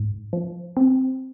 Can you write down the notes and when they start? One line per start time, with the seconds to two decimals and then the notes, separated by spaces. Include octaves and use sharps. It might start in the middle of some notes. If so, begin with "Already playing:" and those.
Already playing: G#2
0.33 F3
0.77 C4